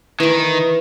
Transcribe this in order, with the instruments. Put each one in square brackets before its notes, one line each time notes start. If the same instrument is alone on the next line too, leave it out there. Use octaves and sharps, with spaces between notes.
[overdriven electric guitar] D#3 [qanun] E3 C#6